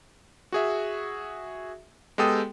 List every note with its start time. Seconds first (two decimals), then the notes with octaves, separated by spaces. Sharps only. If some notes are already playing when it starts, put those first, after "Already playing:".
0.52 F#4 G#4 E5
2.18 G#3 B3 G4 A4 G5 D#6